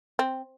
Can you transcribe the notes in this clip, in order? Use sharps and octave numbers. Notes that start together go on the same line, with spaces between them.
C4